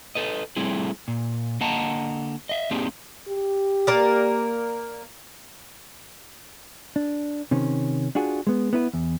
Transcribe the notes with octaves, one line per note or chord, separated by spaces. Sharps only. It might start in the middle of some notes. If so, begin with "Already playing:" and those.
A4 B4 D#5
G3 A3 C4 E4 G#4
A#2
D3 A#3 D#5 F#5 A5 A#5
D#5 E5
A#3 C4 D4 D#4 G4 G#4
G4
A#3 A#4 D5
D4
C3 D#3 C#4
D4 F4 F#4 G#4
G#3 B3
B3 E4 B4
E2